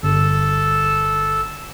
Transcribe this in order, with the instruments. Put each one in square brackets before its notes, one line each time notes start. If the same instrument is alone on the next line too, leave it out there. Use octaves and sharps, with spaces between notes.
[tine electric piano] G1 [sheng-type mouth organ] A4